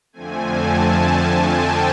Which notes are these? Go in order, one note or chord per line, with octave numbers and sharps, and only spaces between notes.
F2 D3 F3 A3 C4 G#5
A5
G#5
G#5
G5